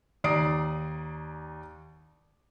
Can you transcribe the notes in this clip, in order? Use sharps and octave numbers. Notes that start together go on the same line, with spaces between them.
D#2 D5 A#5 D#6 C7 D7